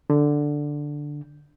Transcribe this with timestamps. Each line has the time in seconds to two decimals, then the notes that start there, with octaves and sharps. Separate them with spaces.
0.10 D3